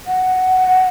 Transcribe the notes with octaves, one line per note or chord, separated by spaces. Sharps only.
F#5